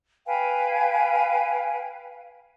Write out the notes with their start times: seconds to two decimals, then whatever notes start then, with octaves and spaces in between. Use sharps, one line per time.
0.26 B4 F5 G5 G#5